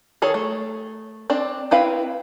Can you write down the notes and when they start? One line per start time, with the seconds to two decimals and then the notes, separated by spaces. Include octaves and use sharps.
0.22 D#3 G#4 A4 C#5
0.34 A3
1.30 C4 D4 D5
1.71 C4 E4 B4 F5 G5